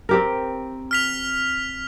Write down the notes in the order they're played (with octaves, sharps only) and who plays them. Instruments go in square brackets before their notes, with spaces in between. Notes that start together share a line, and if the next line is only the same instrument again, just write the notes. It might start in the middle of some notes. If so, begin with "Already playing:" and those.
[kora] C4 G4 A#4
[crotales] F6 B6 F7